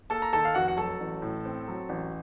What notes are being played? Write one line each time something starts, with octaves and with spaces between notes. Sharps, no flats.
A#3 A4 A5
A#5
D#3 A4 A5
F5
F1 F#4 F#5
F#5
F#3 A4 A5
A1
A2
C4
F#3
A1